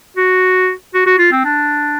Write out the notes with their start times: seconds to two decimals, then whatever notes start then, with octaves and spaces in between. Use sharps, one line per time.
0.17 F#4
0.94 F#4
1.06 F#4
1.19 F4
1.32 C4
1.44 D4